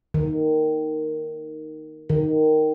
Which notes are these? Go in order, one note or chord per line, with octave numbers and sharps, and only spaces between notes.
D#3
D#3